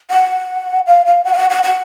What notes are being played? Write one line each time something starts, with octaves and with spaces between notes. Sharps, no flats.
F#5
F5
F5
F#5
F5
F#5
F#5
F#5